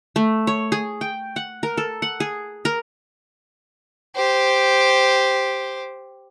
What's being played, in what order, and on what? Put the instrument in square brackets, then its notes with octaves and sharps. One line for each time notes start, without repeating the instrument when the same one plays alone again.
[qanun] A3
C#5
G#4
G5
F#5
A#4
A4
F#5
G#4
A#4
[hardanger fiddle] G4 C5